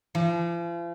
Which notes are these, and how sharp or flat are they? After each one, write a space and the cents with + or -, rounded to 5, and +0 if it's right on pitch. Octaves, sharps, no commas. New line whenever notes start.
F3 -40